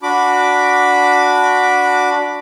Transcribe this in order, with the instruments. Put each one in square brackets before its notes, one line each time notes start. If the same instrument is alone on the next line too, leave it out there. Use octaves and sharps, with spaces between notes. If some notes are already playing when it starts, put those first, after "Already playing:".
[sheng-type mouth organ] D4 F#4 B5 D6